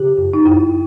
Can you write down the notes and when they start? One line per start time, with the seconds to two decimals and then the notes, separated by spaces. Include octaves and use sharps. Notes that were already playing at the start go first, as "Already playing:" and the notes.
Already playing: C#3 G4
0.18 F#2
0.33 D#4
0.45 F#2 E4